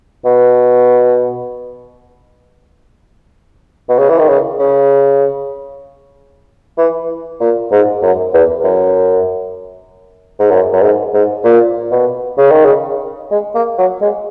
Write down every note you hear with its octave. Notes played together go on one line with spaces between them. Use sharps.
B2
B2
C#3
E3
D#3
C#3
C#3
E3
A#2
G#2
F#2
E2
F#2
G#2
F#2
F#2
G#2
G#2
A#2
B2
C#3
D#3
C#3
G#3
A#3
F#3
G#3